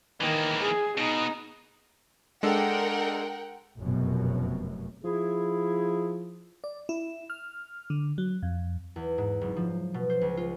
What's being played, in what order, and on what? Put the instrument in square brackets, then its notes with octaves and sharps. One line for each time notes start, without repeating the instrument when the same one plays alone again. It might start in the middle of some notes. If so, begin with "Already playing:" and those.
[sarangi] D#3 [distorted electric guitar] E3 A#3
[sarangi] G#4
[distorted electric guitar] B2 [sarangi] D#4
[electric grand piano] G#3 D4 A4 [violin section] A#4 F#5 G5
[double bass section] F1 F#2 B2
[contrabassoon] F3 [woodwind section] E4 G#4
[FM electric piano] D5
E4
F6
D3
F#3
F2
[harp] E2
G#2
F#1
F3
B2
C5
C#2
F4